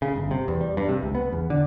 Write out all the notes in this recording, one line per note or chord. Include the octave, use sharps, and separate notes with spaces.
C#3
G1
C3
E2
G3
G2
C3
C#2
B3
E2
D3